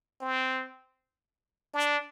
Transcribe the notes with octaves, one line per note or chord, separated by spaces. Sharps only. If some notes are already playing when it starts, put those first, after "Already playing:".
C4
D4